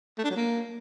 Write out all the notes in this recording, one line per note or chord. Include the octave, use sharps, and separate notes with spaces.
A3
D4
F#3
A#3